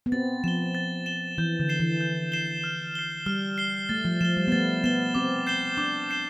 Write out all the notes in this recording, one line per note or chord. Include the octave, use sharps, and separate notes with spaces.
B3
C4 A6
F3 E7 G7
A6
E7 G7
E3 G6
D3
C7 E7 G7
E3
G6
C7 E7 G7
F6
C7 G7
G3 F6
C7 G7
A3 A6
F3
F3 E7 G7
G3
B3
A3 A6
B3 E7 G7
C4 D6
G6 C7 E7 G7
D4 D6
G6 C7 E7 G7